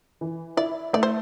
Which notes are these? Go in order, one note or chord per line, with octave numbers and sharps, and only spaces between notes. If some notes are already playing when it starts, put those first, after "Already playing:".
E3
E4 D5
A3 D5
C5